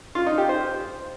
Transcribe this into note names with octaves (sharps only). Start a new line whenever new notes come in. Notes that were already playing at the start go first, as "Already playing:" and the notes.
F4
D#4
G4
C5